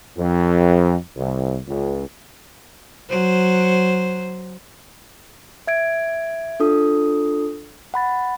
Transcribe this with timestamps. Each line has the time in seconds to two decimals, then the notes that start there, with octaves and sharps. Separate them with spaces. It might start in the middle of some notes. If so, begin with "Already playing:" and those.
0.18 F2
1.17 C2
1.67 C#2
3.10 F#3 C5
5.67 E5 G#6 D7
6.60 D4 F4 A4 D#6
7.94 F#5 B5 A6